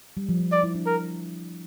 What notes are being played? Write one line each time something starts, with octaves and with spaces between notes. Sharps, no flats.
G3
F3
F3
D5
E4
D4
A#4